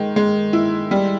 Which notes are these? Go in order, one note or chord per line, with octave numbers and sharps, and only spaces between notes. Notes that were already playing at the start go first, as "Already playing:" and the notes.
Already playing: D#3 G#3
G#3
E4
G3